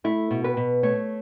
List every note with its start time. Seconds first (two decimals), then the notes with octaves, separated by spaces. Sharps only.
0.04 A3 E4
0.31 B2
0.44 B4
0.57 B2
0.83 A3 C#5